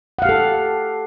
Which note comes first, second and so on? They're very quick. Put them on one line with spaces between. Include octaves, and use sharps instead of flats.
F#5 F5 G4 A4